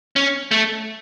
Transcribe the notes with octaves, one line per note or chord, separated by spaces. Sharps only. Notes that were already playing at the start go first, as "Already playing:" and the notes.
C#4
A3